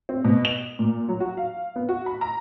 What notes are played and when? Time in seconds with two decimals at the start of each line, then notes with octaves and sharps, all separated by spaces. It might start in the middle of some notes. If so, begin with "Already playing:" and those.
0.09 C4
0.24 B2
0.45 F7
0.79 A#2
1.09 F#3
1.20 F#4
1.37 F5
1.76 B3
1.89 F#4
2.06 B5
2.21 A#5